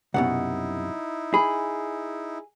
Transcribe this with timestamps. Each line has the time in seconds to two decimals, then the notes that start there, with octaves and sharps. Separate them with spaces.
0.14 C2 F#2 B2 D#4 E4 F#5
1.34 G#4 B5